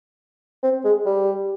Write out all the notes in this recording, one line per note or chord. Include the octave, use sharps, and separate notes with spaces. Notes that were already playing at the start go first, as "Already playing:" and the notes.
C4
G#3
G3